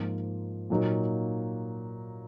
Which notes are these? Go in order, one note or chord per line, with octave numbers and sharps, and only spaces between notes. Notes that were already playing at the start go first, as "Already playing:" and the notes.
Already playing: G#2 F3 A#3 F4
A#2 F#3 A#3 D#4